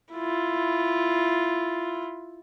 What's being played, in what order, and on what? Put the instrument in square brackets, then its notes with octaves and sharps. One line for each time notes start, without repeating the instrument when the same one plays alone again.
[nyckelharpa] E4 F4